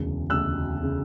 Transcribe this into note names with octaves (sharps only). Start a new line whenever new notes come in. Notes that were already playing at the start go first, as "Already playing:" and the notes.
Already playing: E1 D2 C#3
E1 D2 C#3 E6 F#6
C#3